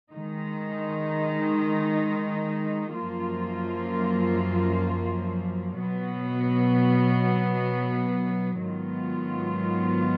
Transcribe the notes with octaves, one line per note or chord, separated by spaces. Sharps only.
D#3 G#3 D#4
F#2 F3 A#3 F4
B2 F#3 B3
G#2 D#3 F#3 B3 F4